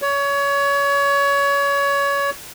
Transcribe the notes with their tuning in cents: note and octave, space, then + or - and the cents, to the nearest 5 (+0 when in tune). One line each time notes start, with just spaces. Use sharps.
C#5 +25